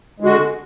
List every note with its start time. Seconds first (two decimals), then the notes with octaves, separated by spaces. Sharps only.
0.20 G#3
0.23 D3
0.25 F#4